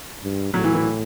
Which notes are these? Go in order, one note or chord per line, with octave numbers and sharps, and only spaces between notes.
G2
A2 F#3
E3
E3